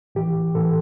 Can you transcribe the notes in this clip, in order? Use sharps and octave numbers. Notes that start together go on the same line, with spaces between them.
A2 E3 G4
A2 E3 A4